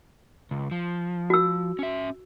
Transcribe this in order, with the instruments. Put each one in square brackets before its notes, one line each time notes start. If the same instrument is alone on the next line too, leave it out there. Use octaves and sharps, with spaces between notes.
[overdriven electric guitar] C#2
F3
[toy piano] F#4 E6
[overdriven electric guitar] C#4 E5